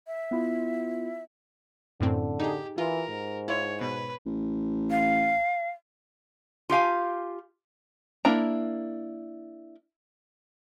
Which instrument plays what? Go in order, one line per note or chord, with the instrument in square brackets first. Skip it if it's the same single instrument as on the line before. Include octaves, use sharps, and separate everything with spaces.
[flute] E5
[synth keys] B3 E4 F4
[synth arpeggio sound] F#2 A2 C4 [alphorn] D3
[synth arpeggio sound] D#4 G#4 [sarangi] G4
[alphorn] E3 [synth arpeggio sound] F4 [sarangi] A#4
[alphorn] G#2
[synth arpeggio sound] E4 F4 [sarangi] C#5
[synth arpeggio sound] B2 [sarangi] B4
[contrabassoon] A1
[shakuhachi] F5
[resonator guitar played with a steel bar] F4 G4 F5 G#5
[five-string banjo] A#3 D4 E4 A#5